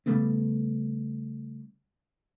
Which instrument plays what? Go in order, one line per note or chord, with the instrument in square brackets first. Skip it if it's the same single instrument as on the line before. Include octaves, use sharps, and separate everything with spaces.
[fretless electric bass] C#3 G3 A3 B3